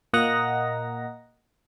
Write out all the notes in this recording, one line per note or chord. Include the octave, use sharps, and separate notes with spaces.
A#2 A#3 D#5 F#5 A#5 A#6